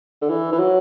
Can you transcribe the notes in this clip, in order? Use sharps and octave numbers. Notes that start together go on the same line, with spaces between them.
D3
E3
E3
F#3